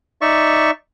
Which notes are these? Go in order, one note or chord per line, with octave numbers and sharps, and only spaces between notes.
D#4 D5 E5 C#6